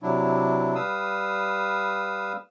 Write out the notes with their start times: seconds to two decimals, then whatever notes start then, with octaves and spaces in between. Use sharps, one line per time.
0.02 C3 F#3 D4 E4
0.75 G3 B4 F5 D#6 E6